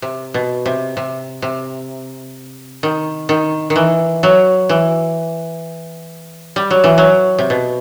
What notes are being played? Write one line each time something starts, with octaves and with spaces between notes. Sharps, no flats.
C3
B2
C3
C3
C3
D#3
D#3
D#3
E3
F#3
E3
G3
F#3
E3
F#3
C3
B2